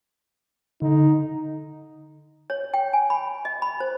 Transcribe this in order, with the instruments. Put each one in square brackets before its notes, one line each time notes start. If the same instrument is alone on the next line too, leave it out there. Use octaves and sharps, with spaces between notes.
[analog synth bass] D3 [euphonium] D#4
[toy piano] C#5
G5
G#5
B5
D#5
B5
C5